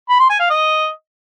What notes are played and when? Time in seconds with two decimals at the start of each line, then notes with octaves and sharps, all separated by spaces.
0.09 B5
0.19 C6
0.29 G#5
0.40 F5
0.50 D#5